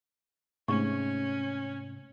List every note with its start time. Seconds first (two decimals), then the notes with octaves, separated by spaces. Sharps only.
0.68 G#2 C3 A3 C#4 C#6